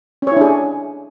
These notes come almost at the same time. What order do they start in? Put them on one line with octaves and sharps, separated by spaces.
C#4 C#5 E4 D4 G#4